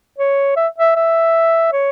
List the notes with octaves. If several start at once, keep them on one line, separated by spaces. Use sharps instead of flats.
C#5
E5
E5
E5
C#5